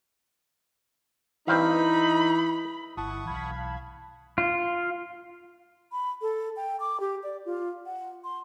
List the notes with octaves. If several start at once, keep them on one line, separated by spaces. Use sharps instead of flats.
G2 E3 C4 D#4 F5 B5
G1 E4 F#5 A5 C#6 D#6
B1 E3 F5 B5 G#6
F4
B5
A4
G5
D6
G4
D5
F4
F#5
C6